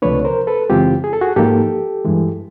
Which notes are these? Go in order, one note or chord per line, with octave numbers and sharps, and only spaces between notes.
C#2 C3 F3 A3 D4 B4 C#5
A#4 C5
A4 B4
F#2 C#3 E3 G#3 C4 F4 G4
G#4
A4
F#4 G#4
G#2 F3 A#3 D#4 G4 A4
G2 E3 G#3